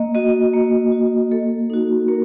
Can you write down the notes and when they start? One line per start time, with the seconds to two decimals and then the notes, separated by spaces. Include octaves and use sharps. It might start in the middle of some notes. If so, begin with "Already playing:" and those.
Already playing: A#3 D#5
0.15 F#4 D#5
0.54 A#3
0.92 F#4
1.32 A#3 A4
1.70 D#4 F#4
2.08 A#3 A#4